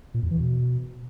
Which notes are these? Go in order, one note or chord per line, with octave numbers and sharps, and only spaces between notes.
A#2
E2
E3
B2